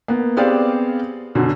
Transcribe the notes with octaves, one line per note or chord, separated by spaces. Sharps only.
A#3 B3
B3 C4 G4 G#4 D5 F5
F#2 B2 D3